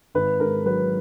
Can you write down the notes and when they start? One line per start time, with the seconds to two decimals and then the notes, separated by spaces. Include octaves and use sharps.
0.15 G#1 B4
0.40 G#2 A#4
0.66 F#3 B4